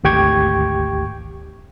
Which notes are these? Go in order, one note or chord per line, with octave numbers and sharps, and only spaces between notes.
G#1 D2 G4 G5 C#6 G#6